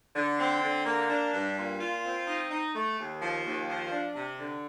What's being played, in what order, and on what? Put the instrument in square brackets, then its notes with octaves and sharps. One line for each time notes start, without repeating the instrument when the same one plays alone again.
[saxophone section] D3
C4
D3
A#3
D4
G2
A#2
F4
C4
D#4
D#4
A3
D#2
F3
D#2
F3
D4
C3
D3